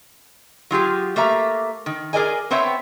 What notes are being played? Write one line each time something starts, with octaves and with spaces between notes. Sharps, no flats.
F#3 F4 G4 G#4
A3 A#3 G4 E5 A#5
D#3
G#4 A#4 D5 D#5 G#5
B3 C4 C5 C#5 E5 G5